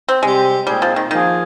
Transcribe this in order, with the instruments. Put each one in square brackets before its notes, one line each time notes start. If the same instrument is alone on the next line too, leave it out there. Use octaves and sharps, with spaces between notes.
[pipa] C4
[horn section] C3 G3 C4 G4 [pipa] G#3
[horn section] A#2 G#3 C4 D#4 G#4 [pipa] G3
[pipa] F3
D#3
[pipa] D#3 [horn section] F3 A#3 F4 G#4